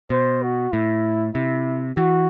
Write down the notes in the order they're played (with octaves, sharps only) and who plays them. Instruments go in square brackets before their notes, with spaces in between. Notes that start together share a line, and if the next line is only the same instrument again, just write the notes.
[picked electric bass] B2 [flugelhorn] C5
[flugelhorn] F#4
[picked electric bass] A2 [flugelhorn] E4
[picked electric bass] C3 [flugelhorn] E4
[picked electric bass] E3 [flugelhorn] F#4